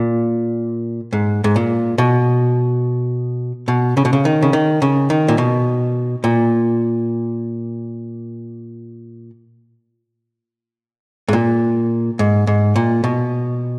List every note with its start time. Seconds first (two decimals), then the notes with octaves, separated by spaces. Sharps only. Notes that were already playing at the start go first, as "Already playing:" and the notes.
Already playing: A#2
1.13 G#2
1.44 G#2
1.56 A#2
1.98 B2
3.68 B2
3.97 C#3
4.05 B2
4.13 C#3
4.25 D#3
4.43 C#3
4.53 D#3
4.82 C#3
5.10 D#3
5.28 A#2
5.38 B2
6.24 A#2
11.28 G#2
11.33 A#2
12.19 G#2
12.47 G#2
12.76 A#2
13.04 B2